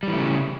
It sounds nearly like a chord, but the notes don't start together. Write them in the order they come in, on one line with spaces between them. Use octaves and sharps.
G3 E3 A3 C#3